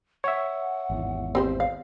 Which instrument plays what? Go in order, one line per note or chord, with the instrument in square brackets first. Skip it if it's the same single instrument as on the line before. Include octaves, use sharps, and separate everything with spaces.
[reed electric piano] C#5 E5 [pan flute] F#5
[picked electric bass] G#1 E2
[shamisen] C4 G4 C5
F5